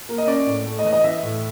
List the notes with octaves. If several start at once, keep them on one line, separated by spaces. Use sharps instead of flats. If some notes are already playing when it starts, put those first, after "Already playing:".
A#3
D#5
C#4 D5
A2
A3
D#5
E3
D#5
E3 E5
A2